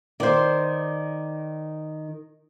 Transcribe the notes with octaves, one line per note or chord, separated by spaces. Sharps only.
D#3 C5 D5